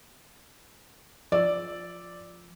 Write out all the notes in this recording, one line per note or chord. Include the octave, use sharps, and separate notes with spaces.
F3 D5 E6